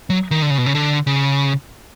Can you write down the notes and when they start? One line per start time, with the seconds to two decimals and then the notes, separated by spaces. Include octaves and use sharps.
0.10 F#3
0.31 D#3
0.42 D3
0.50 C#3
0.58 B2
0.66 C#3
0.75 D3
1.07 C#3